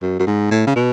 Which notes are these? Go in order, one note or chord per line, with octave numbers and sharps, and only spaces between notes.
F#2
F#2
G#2
A2
C#3
B2